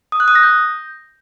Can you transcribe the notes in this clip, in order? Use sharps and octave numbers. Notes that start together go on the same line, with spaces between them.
D#6
F#6
D#6
A#6
G6